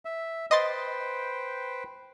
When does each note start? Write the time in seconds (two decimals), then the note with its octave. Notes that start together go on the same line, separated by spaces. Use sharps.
0.05 E5
0.51 B4 C5 D#5 G5 C6 A6